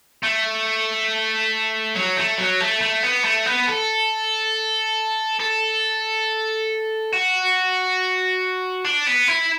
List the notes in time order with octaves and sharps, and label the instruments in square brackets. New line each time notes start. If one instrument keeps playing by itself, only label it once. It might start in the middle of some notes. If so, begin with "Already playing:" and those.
[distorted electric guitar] A3
F#3
A3
F#3
A3
A3
B3
A3
B3
A4
A4
F#4
D4
B3
E4